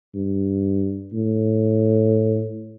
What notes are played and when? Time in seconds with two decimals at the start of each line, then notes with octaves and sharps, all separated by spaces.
0.15 G2
1.13 A2